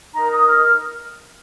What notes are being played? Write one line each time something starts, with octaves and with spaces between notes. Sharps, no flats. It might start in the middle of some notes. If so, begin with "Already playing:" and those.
D#4 A#4 A#5
D#6
F6